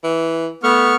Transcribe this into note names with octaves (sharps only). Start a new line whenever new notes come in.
E3
A3 B3 C#6 F6